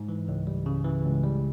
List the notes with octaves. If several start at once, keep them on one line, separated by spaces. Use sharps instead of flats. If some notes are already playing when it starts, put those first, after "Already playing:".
Already playing: G#2
E3
C#2
G3
C#3
E3
C#2
G3